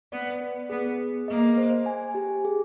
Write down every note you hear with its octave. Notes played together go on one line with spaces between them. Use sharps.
B3 D5
B4
B3 G#4
G#4
A#3 D#5
C5
G#5
G4
G#4